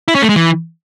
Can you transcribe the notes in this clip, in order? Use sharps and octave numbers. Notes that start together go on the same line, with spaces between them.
E4
C#4
A3
G#3
E3